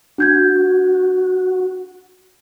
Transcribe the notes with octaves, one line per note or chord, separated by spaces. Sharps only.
D4 F#4 G6 G#6